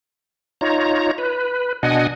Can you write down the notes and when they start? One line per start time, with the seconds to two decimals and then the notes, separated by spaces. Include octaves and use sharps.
0.61 D#4 F4 C#5 A#5
1.18 B4
1.83 B2 D4 D#5 F#5 G#5